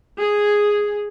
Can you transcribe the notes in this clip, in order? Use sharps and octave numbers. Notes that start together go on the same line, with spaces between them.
G#4